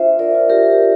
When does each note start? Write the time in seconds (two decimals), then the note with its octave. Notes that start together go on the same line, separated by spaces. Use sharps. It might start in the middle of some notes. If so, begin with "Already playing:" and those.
Already playing: D4 F4 C5 E5
0.19 A#4 D5
0.35 F4
0.50 G4 A#4